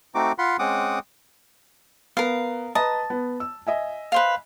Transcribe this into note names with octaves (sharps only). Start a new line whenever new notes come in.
A3 C4 D#4 F#4 D6
F4 F#5 B5 C6
G#3 C4 C#4 F#5 D6 D#6
B3 A#4 F5
B4 D#5 A5 A#5 D#6
B3
E6
D#5 E5 G#5
B4 C5 F5